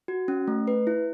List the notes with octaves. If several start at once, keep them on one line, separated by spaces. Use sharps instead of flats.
F#4
C#4
A3
B4
E4